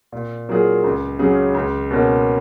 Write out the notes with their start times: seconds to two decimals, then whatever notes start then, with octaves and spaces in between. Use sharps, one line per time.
0.12 A#2
0.49 F#3 A#3 F4 G#4
0.84 C#2
1.19 C#3 F#3 C#4 G#4
1.54 C#2
1.91 B2 A#3 C#4